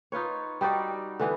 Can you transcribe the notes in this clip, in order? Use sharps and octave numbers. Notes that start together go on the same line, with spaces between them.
D#4 F4 B4 C#5
G3 D#4 F#4 D5
D3 E3 B3